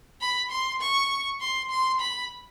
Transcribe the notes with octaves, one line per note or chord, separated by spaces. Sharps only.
B5
C6
C#6
C6
C6
B5